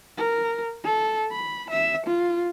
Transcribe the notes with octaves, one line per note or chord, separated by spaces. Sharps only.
A#4
A4
B5
E5
F4